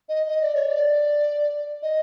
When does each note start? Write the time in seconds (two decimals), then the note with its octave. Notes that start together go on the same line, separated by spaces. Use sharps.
0.09 D#5
0.28 D#5
0.41 D5
0.55 C#5
0.69 D5
1.82 D#5